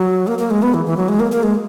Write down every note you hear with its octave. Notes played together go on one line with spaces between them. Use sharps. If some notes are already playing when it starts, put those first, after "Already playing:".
Already playing: F#3
A#3
A#3
G#3
B3
E3
E3
F#3
G#3
A#3
A#3
G#3